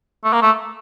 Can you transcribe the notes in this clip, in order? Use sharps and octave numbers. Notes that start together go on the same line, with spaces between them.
A3
A#3
A3